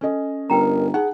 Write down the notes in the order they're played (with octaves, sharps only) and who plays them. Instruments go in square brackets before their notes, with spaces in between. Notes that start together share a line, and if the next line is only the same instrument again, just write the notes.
[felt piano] C#4 A4 D#5
[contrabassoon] G1 [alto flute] A#4 [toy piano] B4 G5 A#5
[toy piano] D#4 [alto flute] G#4 [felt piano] F#5